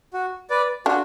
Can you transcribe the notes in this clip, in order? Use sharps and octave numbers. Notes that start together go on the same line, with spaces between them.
F#4
B4 D5
D4 F4 F#4